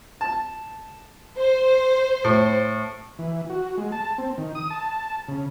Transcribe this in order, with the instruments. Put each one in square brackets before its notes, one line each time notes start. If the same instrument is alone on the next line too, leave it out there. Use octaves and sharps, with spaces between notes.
[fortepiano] A5
[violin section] C5
[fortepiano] A2
[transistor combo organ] E3
F#4
G#3
A5
C4
D#3
D#6
A5
C#3